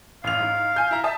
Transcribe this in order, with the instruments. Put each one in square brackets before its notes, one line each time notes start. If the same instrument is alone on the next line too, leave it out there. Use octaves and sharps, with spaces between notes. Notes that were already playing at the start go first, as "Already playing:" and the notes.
[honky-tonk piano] A1 F7 [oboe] F5
[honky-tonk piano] G#2
G#5 G6
E4 A#5
E5 A5 D#6